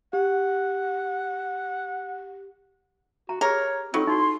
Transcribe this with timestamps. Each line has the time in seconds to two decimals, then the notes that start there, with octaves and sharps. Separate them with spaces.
0.13 G4 F#5
3.29 F#4 A#5
3.41 G4 G#4 A#4 C#5
3.94 F#3 C4 D#4 F4 A4 C#6
4.07 D#4 E4 F#4 C6